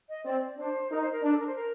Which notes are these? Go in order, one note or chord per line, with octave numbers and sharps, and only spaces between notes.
D#5
C4 D5
D4 C5
D#4 A#4
C5
A#4
D4
A4
A#4
C5
A#4